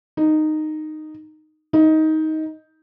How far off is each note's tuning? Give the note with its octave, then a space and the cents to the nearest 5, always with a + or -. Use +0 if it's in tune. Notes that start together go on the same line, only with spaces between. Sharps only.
D#4 -10
D#4 +15